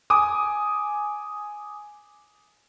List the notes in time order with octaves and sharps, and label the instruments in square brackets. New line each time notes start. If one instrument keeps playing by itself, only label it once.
[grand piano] G#5 D6 D#6